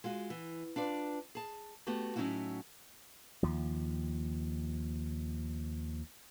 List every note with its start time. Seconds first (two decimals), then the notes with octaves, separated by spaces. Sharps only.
0.04 G#3 F4 F#4
0.30 E3
0.76 D4 F4 B4 D5
1.35 G#4 A5
1.87 A3 B3 F#4 G4
2.16 A2 F#3 C#4 D#4 E4 F#4
3.43 D#2 F3